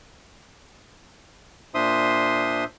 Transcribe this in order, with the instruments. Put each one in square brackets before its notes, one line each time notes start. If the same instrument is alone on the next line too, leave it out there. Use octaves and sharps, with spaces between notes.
[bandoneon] A#2 D4 C5 E5 C6 D#6